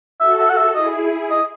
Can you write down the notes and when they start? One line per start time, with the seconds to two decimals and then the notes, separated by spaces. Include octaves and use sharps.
0.20 F#4 A4 E5
0.39 E5
0.50 F#5
0.57 E5
0.75 E4 G#4 D#5
1.30 D#5